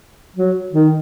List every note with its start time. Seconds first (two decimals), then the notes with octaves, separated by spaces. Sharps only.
0.36 F#3
0.72 D#3